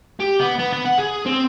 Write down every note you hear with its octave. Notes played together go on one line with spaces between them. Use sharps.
G4
B3
B3
B3
F#5
G#4
C4